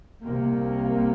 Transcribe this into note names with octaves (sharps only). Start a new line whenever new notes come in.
C2 C3 A#3